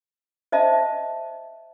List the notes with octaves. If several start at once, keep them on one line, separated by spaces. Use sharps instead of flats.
C5 D#5 E5 A5